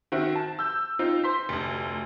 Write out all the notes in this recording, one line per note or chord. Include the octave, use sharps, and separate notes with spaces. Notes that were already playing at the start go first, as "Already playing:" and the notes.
D#3 C4 F#4 E5
A5
E6 G6
C4 D#4 F4
C5 C6 B6
F1 D2